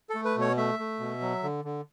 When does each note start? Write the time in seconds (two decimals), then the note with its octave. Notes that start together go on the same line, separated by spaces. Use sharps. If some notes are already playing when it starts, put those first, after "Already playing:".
0.10 A4
0.15 A3
0.25 B4
0.37 B2 C#5
0.57 A3 E5
0.79 A3
1.00 B2
1.21 F#3
1.43 D3
1.65 D3